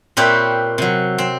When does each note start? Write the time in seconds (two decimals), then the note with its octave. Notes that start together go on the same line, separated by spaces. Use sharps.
0.17 A#2 C4 G4 B4 C#5 E5
0.78 C3 F#3
1.18 C4